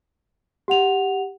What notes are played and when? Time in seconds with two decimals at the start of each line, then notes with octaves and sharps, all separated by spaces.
0.68 G4 F#5 F7